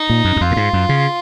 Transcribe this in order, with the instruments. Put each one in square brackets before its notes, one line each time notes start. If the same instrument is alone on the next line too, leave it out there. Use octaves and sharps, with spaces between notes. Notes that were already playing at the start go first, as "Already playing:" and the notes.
Already playing: [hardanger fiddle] D#4
[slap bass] A#2
F#2
F#2
[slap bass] F2 [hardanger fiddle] F4
[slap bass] A#2
G#2
F#2
C#3